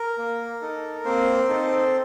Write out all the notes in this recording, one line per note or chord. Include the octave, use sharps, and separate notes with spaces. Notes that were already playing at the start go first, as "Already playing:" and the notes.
Already playing: A#4
A#3
D#4 A4
A#3 C4 C5
D#4 A4